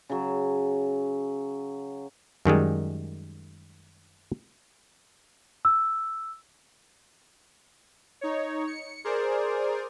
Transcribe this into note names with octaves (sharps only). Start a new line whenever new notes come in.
C#3 F#3
F#2 D#3 G3 G#3
E6
D#4 C#5
C#7
G#4 A#4 C5 D5